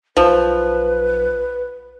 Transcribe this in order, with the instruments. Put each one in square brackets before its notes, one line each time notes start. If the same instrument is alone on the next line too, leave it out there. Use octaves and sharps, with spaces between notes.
[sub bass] B1 [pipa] F3 [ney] B4